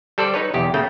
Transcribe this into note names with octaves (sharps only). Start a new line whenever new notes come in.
G3 A4 C5 D5
D#4 B4 C#5
B1 E2 G4
C#3 A3 A#3 G5